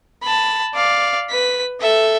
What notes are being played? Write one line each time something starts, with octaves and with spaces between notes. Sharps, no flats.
A5 B5
D5 F5
B4 B6
A4 E5